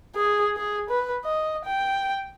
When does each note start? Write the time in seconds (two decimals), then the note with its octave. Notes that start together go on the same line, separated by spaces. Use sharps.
0.16 G#4
0.57 G#4
0.90 B4
1.25 D#5
1.66 G5